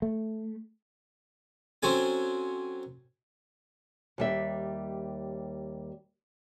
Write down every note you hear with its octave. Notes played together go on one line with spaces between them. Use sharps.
A3
F#3 C4 C#4 A4 G#5
D#2 G3 E5